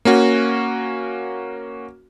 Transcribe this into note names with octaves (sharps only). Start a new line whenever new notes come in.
A#3 C#4 F#4